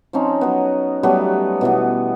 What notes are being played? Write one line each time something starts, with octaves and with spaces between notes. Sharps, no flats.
F3 C4 C#4 D#4
F#3 B3
F#3 G3 A3 B3
B2 E3 B3